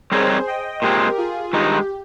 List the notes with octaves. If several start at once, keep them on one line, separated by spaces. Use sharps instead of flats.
G3 C4 D#4 G#4 A#4 C5 C#5
D#5 G5
A#2 G#3 C4 G4 A#4
F4 G#4
G2 D#3 G#3 D#4 G4